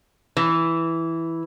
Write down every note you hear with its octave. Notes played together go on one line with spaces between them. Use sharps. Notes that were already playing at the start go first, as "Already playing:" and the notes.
E3